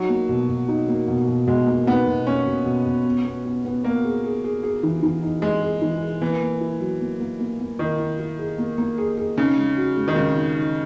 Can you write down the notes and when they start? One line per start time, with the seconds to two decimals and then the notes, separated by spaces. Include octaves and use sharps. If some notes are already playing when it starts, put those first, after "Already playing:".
Already playing: F#3 D#4
0.09 A#3
0.29 B2
0.49 B2
0.68 D#4
0.88 A#3
1.08 B2
1.28 B2
1.47 B2 G#3
1.67 A#3
1.87 B3 D#4
2.06 B2
2.26 A#3 C#4
2.46 B2
2.66 B2
2.86 B2
3.05 B3
3.25 B3
3.45 B3
3.65 B3
3.84 A#3 B3
4.05 G#4
4.24 G#4
4.44 G#4
4.63 G#4
4.83 E3
5.03 E3
5.22 D#4
5.42 G#3 G#4
5.62 G#4
5.82 E3
6.02 G#4
6.21 E3 A#3
6.42 A#3
6.61 E4
6.80 F#3
7.01 A#3
7.20 A#3
7.39 A#3
7.60 A#3
7.79 D#3 E4
7.99 E4
8.19 E4
8.38 G#4
8.58 A#3
8.78 A#3
8.98 G#4
9.17 G#4
9.37 C#3 D#4
9.57 G#3
9.77 F#4
9.97 G#3
10.08 D#3
10.16 C#3 G#3
10.36 D#4
10.56 D#4